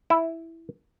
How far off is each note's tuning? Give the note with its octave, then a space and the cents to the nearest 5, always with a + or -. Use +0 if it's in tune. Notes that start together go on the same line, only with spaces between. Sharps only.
E4 +0 A5 +0